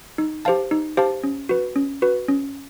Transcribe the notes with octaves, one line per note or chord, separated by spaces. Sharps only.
D#4
G4 C5 F5 A5
D#4
G4 C5 F5 A5
C#4
F#4 B4
C#4
F#4 B4
C#4